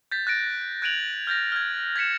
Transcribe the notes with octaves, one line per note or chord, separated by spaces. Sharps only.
G6 A6 B6
F#6 A6 A#6 D7
F#6 G#6 D7 D#7 F7 F#7
F6 G6 A6 A#6
F6 G#6
G#6 A#6 B6 C#7 E7